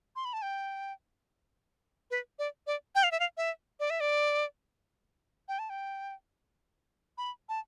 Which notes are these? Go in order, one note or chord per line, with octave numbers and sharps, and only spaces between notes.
C6
B5
A5
G5
B4
D5
D5
G5
F5
E5
F5
E5
D5
E5
D5
G5
A5
G5
B5
A5